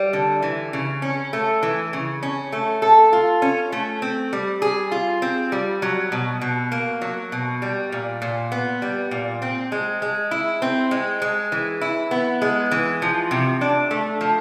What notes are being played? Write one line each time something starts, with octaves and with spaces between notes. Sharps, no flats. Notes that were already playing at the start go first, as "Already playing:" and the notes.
Already playing: G3
D3
E3
C#3
C#4
A3
E3
C#3
C#4
A3
A4
F4
C#4
A3
C4
G3
G#4
F4
C4
G3
F#3
B2
B2
A#3
F#3
B2
G3
A#2
A#2
B3
G3
A#2
C4
G#3
G#3
E4
C4
G#3
G#3
E3
E4
B3
G#3
E3
F3
C3
D4
A3
F3